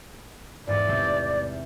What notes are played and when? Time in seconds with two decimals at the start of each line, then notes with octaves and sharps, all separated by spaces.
0.67 E2 G#2 D5
0.87 C3 A3 C4